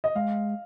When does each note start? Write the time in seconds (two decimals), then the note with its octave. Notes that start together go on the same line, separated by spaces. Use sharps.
0.04 D#5
0.15 G#3 F5